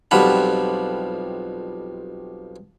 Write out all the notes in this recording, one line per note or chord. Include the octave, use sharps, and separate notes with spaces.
B1 F2 F3 G3 F#5 B5